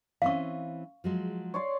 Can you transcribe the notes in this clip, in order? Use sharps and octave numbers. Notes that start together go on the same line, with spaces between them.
E3 C4 C#4 F5 C#6
F3 F#3 G#3
C#5 D5 C6